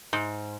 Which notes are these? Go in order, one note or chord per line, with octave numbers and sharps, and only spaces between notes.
G#2